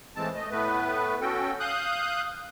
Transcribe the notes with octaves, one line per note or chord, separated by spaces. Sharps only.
A2 E3 G#3 C4 A5
A3 D#5
A2 A3 B3 B4
C#4 F#4 A4 G5
F5 D#6 F#6 G6